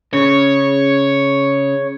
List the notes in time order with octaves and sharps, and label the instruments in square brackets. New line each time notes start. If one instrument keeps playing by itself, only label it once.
[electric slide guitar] C#3 [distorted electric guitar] C#5